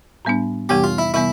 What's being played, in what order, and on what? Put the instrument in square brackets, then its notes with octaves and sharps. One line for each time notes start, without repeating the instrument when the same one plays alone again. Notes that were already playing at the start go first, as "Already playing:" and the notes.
[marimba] A2 G3 B3 D4
[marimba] F2 C3 E3 G3 B3 [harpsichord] G4
[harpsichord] F4
E4
[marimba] C3 E3 G3 B3 [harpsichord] E4